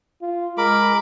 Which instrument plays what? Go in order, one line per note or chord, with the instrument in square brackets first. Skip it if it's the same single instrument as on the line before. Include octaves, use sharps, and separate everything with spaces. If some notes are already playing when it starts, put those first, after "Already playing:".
[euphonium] F4
[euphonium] G#3 [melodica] A#4 [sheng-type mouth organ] B5 D6